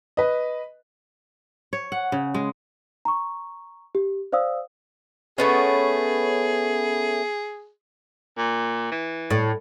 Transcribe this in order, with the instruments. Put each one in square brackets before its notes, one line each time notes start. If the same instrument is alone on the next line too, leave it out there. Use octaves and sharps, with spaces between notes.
[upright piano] B4 D#5
[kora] C#5
F#5
C#3
G#3
[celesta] A#5 C#6
G4
C5 D5 F5 D#6 E6
[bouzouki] A3 B3 C#4 [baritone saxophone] G#4
[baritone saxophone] A#2
E3
[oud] A2